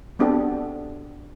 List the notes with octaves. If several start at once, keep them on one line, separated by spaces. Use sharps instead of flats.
B3 C4 D4 F#4 G4 A4